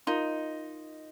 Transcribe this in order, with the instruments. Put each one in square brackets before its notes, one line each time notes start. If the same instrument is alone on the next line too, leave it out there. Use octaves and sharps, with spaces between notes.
[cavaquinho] D#4 [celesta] F4 A#4 F5 C6